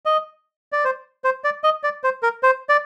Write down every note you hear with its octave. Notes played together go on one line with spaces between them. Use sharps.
D#5
D5
C5
C5
D5
D#5
D5
C5
A#4
C5
D5